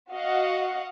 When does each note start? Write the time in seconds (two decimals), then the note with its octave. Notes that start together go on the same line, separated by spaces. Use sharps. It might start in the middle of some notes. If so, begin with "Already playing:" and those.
0.12 F#4 D#5 F5 F#5